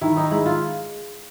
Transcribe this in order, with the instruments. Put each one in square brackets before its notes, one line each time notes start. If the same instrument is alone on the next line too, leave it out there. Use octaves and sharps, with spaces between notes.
[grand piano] D#3 [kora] E4
[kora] D#4
[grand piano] G#3 [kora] E4
[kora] F4